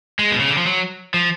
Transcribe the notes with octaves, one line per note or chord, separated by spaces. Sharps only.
G#3
B2
C#3
D3
F3
F#3
F3